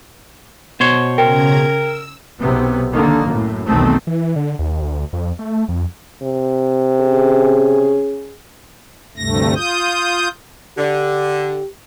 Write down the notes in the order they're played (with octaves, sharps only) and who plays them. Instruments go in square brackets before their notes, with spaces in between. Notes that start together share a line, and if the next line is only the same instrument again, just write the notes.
[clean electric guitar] B2 C5 C#5
[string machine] C#3 A#5 G#6 [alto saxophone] A#4 [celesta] G5
[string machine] E6
[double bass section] B1 C3 B3
D3 D#3 A#3
F#2 A2
B1 E2 B2 D#3 A3 C4
[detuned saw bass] E3
D3
D#2
D2
F2
A3
F2
[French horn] C3
[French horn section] C#4 G#4
[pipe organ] D2 G2 C3 A3 A#6
F4 D#6 G6
[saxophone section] D3 [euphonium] G4